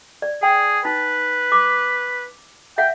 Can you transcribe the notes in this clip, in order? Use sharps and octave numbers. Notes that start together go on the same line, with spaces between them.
D5
G#4 G5
D#4 B4
D6
E5 F#5 G5